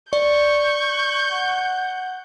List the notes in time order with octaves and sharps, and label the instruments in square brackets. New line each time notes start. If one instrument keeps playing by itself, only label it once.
[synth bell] D5 [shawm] C#6 [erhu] G6
[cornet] F#5